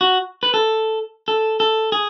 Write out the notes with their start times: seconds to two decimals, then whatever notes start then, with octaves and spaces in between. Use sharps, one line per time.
0.01 F#4
0.43 B4
0.54 A4
1.28 A4
1.60 A4
1.92 G#4